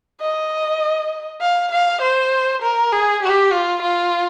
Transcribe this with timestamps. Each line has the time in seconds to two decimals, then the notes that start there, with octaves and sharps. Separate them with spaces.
0.21 D#5
1.41 F5
1.71 F5
2.01 C5
2.62 A#4
2.92 G#4
3.22 G4
3.52 F4
3.82 F4